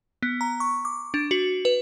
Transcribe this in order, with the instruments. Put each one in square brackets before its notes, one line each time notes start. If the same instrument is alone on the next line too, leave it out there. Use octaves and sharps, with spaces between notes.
[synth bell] B3
A#5
C#6
D6
D4
F#4
B4